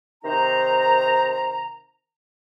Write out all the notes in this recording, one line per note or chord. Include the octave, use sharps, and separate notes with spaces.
C3 D#3 D#4 C5 A#5